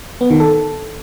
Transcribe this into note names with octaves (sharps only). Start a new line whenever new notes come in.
B3
D#3
A4